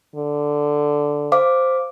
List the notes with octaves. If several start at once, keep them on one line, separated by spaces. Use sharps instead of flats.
D3
C5 F5 D6